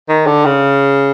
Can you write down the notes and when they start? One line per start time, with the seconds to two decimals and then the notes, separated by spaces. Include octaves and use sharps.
0.09 D#3
0.27 D3
0.45 C#3